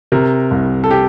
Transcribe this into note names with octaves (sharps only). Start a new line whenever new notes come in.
C3 A#4
C2
A4
G4